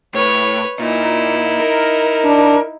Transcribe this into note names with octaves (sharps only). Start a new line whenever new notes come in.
A2 B4 C#5
A#2 D#4 E4
A#4
D4